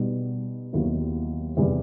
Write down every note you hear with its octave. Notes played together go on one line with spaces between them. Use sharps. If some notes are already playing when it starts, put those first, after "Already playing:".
Already playing: B2 G3 B3 D#4
D#2 D#3 F#3 B3 E4
E2 C3 D#3 G3